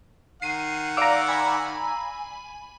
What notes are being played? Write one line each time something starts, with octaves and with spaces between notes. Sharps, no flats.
D#3 F#5 C7 D#7
D5 F5 A#5 D6 E6
G#5 B5